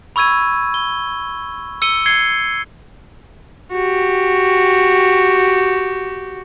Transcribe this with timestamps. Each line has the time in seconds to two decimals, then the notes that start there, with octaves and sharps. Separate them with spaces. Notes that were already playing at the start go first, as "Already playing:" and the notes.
0.16 B5 C#6 E6 G#6 D#7
0.74 G7
1.82 E6 C#7 D#7 G7
2.06 G#6 C7 C#7 G7
3.72 F#4 G4